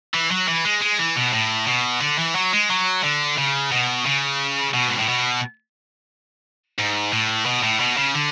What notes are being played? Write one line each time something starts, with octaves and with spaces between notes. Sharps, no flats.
E3
F#3
E3
G#3
G#3
E3
B2
A2
B2
D3
E3
F#3
G#3
F#3
D3
C#3
B2
C#3
B2
G#2
A2
B2
G#2
A2
B2
A2
B2
C#3
D3